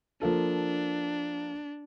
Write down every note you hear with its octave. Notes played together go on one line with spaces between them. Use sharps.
F3 A#3 D4 A4